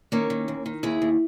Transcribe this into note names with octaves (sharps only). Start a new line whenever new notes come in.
D#3 A#3 C#4
D#3
D#2
D#3
D#2 E4 G#4
D#2